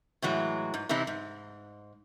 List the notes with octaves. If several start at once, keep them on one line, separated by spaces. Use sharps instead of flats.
A2 E3 F#3 G#3
G#2
C3 E3 C4 D#4 E4
G#2